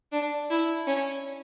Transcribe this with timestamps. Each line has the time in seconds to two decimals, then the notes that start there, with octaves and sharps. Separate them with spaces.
0.12 D4
0.50 E4
0.87 C#4